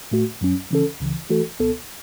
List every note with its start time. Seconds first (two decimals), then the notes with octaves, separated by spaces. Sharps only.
0.11 A2 A3 F#4
0.41 F#2 F#3 C#4
0.71 C#3 E3 C#4 A4
1.00 C#2 C#3 E3
1.29 E3 A3 F#4 A4
1.59 C#2 B2 B3 A4